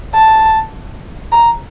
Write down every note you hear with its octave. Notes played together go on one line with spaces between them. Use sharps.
A5
A#5